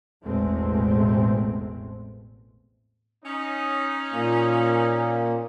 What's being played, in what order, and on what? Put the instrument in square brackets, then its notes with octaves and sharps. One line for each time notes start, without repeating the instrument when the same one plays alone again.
[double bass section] A1 E2 B2 G#3 A3 C4
[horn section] C#4 D#4
[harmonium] A#2 A#3